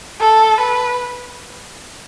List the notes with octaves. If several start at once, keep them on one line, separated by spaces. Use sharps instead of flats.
A4
B4